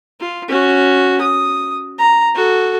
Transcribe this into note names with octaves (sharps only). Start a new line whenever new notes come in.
F4
C#4 F#4
D#6
A#5
F#4 A4